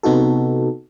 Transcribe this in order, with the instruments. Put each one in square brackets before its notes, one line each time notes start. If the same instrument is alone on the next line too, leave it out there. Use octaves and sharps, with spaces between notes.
[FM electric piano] C3 B3 D#4 F#4 A4